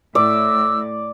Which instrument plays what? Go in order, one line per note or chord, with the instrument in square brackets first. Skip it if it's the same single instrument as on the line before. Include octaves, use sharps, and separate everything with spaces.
[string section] A2 [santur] D5 [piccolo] E6